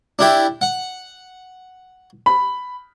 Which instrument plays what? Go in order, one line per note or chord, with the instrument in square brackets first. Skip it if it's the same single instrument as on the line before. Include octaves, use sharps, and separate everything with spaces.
[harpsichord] D4 E4 G4
F#5
[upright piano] B5